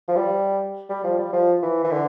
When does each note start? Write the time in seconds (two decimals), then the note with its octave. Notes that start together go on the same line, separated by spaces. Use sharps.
0.08 F3
0.16 G3
0.89 G3
1.04 F3
1.19 G3
1.33 F3
1.62 E3
1.84 E3
1.92 D3